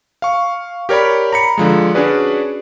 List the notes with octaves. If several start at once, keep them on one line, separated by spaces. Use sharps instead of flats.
F5 C#6
G4 A#4 C#5 D5 B5
A#5 B5 C#7
D3 F3 G#3
C#4 D4 F#4 G#4 B4 D5